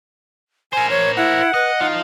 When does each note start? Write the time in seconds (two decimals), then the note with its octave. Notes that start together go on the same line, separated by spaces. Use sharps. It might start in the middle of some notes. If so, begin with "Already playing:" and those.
0.73 A#4 C5 G#5
0.90 C#5
1.17 E4 F#5
1.54 B4 D#5
1.80 F3 D#4 F4